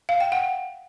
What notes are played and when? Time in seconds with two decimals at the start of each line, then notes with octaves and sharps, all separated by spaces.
0.09 F5
0.20 G5
0.32 F#5